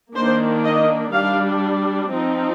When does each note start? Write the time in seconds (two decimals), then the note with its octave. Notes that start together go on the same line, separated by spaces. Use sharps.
0.15 D#3 A#3 D4 C5
0.63 D#5
1.12 G3 D4 F5
2.10 F3 C4 D#4